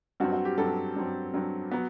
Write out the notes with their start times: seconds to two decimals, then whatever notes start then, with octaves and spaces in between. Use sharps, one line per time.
0.20 G2 F#3 C4 F#4
0.32 F#4
0.45 G4
0.58 G2 F#3 C4 A4
0.96 G2 F#3 C4
1.34 G2 F#3 C4
1.72 F#3 B3